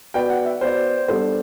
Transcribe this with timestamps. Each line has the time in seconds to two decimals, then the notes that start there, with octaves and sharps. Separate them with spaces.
0.14 B3 F#4 B4 D5 G5
0.30 F#5
0.45 E5
0.61 B3 F#4 B4 C5 D5
1.08 G3 B3 D4 A4 C5